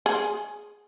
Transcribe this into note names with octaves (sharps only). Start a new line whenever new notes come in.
G#4